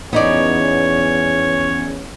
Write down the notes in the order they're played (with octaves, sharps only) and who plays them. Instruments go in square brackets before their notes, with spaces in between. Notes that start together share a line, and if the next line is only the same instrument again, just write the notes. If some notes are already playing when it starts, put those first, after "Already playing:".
[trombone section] E2 C#4 [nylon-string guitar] B3 D#4 D5 [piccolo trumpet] C#5